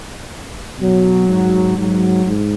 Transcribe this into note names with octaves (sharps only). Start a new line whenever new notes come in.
B2 F#3
G#2
G#2 F#3
G#2